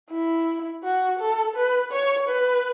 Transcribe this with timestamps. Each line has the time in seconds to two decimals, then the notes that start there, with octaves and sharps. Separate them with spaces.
0.11 E4
0.83 F#4
1.19 A4
1.56 B4
1.91 C#5
2.28 B4